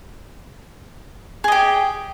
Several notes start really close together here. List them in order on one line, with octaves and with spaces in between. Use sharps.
G#4 D#5 G4